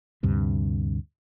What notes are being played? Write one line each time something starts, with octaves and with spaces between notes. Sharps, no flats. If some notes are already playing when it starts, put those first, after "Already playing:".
D2 G2 C3